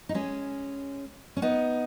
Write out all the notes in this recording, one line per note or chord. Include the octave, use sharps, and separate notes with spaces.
D#4
G#3 C#4
C#4
B3 D#4